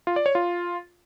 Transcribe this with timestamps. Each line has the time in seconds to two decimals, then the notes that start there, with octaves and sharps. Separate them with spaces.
0.07 F4
0.16 D5
0.26 C#5
0.35 F4